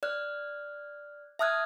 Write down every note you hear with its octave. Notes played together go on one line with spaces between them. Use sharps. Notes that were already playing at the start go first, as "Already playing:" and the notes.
D5 F6 F#6
E5 A5 D#6 F6 F#6 G#6